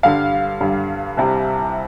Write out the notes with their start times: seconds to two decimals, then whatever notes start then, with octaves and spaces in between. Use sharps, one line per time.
0.03 G2 D3 G3 F5
0.60 G2 D3 G3
1.17 C2 C3 G3